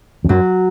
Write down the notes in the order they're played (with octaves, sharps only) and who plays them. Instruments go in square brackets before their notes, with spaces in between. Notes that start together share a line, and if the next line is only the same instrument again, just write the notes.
[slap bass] F2
[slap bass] F#2 [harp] F#3